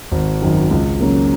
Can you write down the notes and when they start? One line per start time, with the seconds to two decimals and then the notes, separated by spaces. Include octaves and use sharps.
0.12 G#1
0.42 F#2 D#3
0.71 C#2
1.01 C#3 F#3 A#3